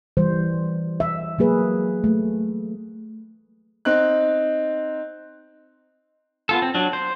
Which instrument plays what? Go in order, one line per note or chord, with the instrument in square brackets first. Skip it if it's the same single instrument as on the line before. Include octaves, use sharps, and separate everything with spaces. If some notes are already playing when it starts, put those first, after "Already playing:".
[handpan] E3 G3 C5
E5
F#3 A#3 G#4 B4
A3
[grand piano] C4 D#4 F#6
[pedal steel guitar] B3 F4 A4
C4
F#3 D4
C5